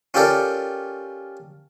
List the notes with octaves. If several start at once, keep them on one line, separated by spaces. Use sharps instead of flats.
C#4 F4 G4 A4 A#4 D5